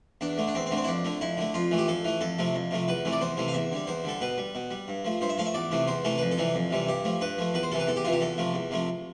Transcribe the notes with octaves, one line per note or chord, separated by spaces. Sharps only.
E2 D4
D3 A3
D4
E2 C4
C4
D3 A3
C4
E4
F2 D4
D3 A3
F2 E4
D3 A3
F2 F4
E3 A3
G4
F2 A4
E3 A3
F2 A4
C3 F3 A3
F2
C3 F3 A3
E2 B4
C3 E3 A3
D5
E2 C5
C3 E3 A3
F5
E2 E5
D3 G3
E2 C5
D3 G3 A4
B2 B4
G3
B2
G3
G2
F3 A3
G2 C5
E5
F3 A3 F5
E5
E2 D5
C3 E3 A3
E2 C5
C3 E3 A3 A4
F2 B4
A4
C3 E3 G3
F2
C3 E3 G3
G2 G4
F3 A3
G2 B4
F3 A3
E2 B4
C5
C3 E3 A4
B4
E2 A4
G4
C3 E3 F4
G4
E2 A4
C3 F3 A3
E2
C3 F3 A3